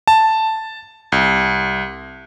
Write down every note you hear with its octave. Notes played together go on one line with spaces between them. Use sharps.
A5
C2